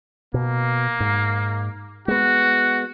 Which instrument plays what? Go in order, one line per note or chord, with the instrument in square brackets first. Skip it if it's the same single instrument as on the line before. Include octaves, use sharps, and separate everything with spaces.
[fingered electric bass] B2 [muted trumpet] A#3
[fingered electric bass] G#2
[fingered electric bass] G#3 B3 [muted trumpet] F#4